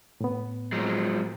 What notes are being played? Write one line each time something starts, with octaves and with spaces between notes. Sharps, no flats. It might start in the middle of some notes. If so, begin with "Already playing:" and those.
A2 B3
F3 F#3 G#3